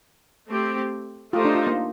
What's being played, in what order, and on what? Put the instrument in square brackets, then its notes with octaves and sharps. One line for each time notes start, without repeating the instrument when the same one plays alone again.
[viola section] A3 C4 G4
[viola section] A3 D#4 G4 C5 [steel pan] F4
[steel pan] D4
F4
A#3